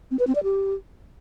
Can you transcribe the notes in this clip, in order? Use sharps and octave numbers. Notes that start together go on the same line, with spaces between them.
C4
B4
C4
D5
G4